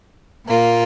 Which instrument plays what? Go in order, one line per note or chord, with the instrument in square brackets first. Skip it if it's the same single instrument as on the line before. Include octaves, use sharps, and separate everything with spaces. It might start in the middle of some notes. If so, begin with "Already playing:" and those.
[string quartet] A#2 A#3 F4